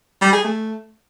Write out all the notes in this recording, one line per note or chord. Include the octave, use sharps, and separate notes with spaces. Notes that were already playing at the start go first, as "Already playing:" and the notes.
G3
G#4
A3